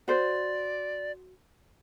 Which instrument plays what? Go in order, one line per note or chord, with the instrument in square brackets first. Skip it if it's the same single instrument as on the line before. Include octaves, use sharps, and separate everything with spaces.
[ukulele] F#4 C5 [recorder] D5